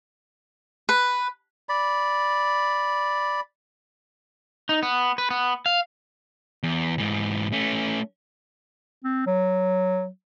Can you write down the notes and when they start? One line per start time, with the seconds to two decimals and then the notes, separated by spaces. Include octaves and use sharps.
0.89 B4
1.69 D5 B5
4.69 D#4
4.83 B3
5.18 B4
5.31 B3
5.66 F5
6.63 E2
6.98 G#2 E3
7.53 A3 C#4
9.04 C4
9.26 F#3